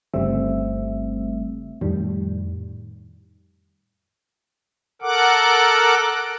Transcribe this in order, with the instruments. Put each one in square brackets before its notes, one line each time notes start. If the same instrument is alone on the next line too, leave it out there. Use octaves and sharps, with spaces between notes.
[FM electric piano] G1 C#3 G3 A3 C4 E5
F2 A2 D#3 G3
[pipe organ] A4 A#4 F#5 D6